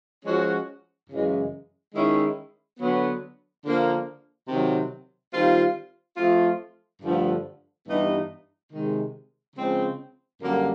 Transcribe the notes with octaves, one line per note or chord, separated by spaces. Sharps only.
F3 G#3 C#4 F#4
F#2 C#3 E3 G#3
D#3 G#3 C#4 E4
D3 F#3 B3
D3 F3 A#3
C3 D#3 F#3
D#3 G3 C4 F4
F3 A3 C4 F4
G2 D3 F3 A3
G2 E3 G3 B3 D#4
C3 D#3 G#3
C#3 F3 G#3 C4
F#2 D3 G3 A#3